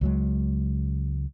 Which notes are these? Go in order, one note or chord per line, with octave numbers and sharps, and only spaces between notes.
C#2 F#3 G#3